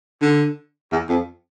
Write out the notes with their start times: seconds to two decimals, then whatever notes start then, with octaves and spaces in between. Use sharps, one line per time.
0.22 D3
0.92 E2
1.09 F2